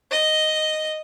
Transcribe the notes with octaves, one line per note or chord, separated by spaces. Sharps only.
D#5